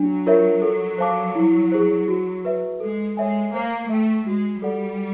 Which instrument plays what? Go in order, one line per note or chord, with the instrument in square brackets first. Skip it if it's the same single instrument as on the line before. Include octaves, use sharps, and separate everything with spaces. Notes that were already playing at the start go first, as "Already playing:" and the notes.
Already playing: [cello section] F#3 [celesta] D4
[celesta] F4 A#4 C#5 E5
A4
C5 F5 A5 D6
E4
G#4 C5
F#4
B4 E5
[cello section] G#3 [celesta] A4
[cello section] G#3 [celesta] C#5 E5 G#5
[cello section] A#3 [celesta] C5
[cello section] A3 [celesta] E5 G5
[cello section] G#3 [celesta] F#4
[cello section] G3 [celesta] A4 D5 F#5